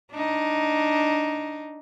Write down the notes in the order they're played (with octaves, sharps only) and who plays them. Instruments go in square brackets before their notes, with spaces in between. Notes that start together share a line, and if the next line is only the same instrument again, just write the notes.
[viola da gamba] D4 D#4